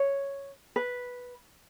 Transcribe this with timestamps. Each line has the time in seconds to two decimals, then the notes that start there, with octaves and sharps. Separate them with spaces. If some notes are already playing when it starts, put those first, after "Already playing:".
Already playing: C#5
0.76 B4